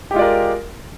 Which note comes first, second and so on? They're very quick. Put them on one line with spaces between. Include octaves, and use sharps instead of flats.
G4 G#3 F4 D5 A#4